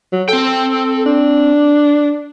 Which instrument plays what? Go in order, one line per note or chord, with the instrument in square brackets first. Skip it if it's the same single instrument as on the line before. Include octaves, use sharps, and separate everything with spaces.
[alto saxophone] F#3
[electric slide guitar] C4 G5 [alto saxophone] A4
[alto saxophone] D4